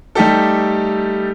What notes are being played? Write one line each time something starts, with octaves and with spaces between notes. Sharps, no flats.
G3 A3 D#4 G4 A4